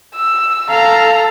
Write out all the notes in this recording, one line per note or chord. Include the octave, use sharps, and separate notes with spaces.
E6
A4 F5 A#5